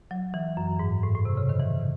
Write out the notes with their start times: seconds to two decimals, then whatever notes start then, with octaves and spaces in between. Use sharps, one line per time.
0.11 F#3
0.34 E3
0.57 F#2
0.79 G#2
1.03 A2
1.15 A2
1.25 C3
1.37 C#3
1.49 D#3
1.60 E3